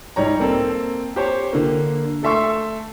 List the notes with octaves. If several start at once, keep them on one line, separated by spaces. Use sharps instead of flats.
G#2 G3 C#5 A#5
A#3 C4 A4
G4 C5 C#5
D3 A#3
A3 A4 E5 C6 C#6 E6